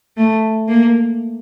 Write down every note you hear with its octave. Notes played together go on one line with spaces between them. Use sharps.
A3
A#3